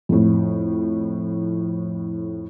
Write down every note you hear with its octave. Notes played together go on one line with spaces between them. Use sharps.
F2 A2